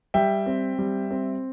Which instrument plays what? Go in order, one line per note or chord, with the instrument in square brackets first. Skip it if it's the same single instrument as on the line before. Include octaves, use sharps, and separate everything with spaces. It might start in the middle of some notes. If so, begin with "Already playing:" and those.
[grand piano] G3 E5 G5
C4
G3
C4